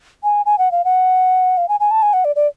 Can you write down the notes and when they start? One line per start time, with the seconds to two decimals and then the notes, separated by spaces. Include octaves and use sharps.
0.23 G#5
0.46 G#5
0.58 F#5
0.72 F5
0.85 F#5
1.57 F5
1.69 G#5
1.80 G#5
1.91 A5
2.02 G#5
2.13 F#5
2.25 D5
2.36 D5